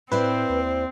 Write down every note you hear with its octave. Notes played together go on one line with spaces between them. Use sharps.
A2 C4 E4 B4 C5 D5
D#2